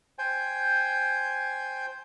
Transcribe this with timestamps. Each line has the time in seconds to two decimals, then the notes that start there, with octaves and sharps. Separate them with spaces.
0.19 C5 G5 G#5